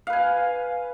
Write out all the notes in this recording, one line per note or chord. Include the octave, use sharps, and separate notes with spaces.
B4 F5 G#5